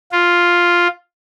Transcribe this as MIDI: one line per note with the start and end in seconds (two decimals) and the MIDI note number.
0.12 0.87 65